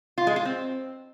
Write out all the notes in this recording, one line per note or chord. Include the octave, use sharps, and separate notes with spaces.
F4
G#3
F4
C4